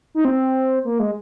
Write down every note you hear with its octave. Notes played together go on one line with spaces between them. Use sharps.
D#4
C4
A#3
G#3